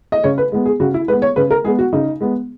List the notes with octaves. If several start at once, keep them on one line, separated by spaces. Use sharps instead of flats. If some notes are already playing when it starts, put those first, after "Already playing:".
D#5
C#3 C#5
B4
G#3 B3
G#4
C#3 F#4
E4
G#3 B3 B4
C#5
C#3 B4
A#4
G#3 B3 G#4
F#4
C#3 D#4
G#3 B3